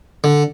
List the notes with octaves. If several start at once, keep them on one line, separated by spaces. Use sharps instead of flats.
D3